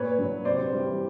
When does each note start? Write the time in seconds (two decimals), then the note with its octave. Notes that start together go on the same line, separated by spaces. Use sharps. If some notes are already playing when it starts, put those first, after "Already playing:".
Already playing: A#2 B4 C#5
0.19 F#3
0.45 C3 C5 D5
0.72 E3 G3